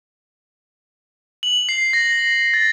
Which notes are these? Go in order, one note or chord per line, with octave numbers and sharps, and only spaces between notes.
F#7
C7
A#6
A6